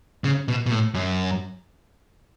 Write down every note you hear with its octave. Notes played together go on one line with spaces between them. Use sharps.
C#3
B2
B2
A2
F#2